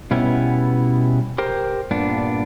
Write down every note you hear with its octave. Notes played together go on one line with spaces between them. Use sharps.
B2 G3 B3 C#4 E4
G4 A#4 C5
G2 A#2 B3 D4